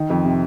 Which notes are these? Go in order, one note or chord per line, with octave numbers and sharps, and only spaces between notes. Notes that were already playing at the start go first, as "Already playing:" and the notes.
Already playing: D#3
F2
C3